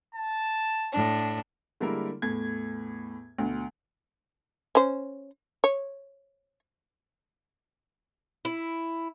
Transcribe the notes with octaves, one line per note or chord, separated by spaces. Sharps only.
A5
A2 D4
D3 G3 G#3 A#3 E4 A#4
E2 A2 G#6
D2 B2
C#4 C5
C#5
E4